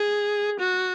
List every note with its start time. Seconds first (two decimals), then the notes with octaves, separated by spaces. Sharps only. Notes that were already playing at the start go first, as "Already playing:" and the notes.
Already playing: G#4
0.59 F#4